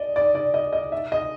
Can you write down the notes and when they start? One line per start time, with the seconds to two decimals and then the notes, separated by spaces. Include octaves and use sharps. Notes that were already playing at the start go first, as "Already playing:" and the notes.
Already playing: D5 D#5
0.16 D5
0.35 D5
0.54 D#5
0.73 D#5
0.92 E5
1.12 D#5